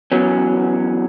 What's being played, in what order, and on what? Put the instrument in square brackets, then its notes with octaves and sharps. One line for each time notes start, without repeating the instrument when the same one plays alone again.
[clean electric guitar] E2 F#3 C#4